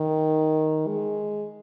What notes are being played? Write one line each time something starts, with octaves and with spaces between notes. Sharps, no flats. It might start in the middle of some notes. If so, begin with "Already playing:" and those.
Already playing: D#3
G#3